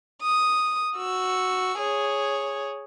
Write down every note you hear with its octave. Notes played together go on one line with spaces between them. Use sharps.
D#6
F#4 E6
G#4 C#5